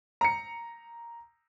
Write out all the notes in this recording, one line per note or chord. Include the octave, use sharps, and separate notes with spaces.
A#5 C#7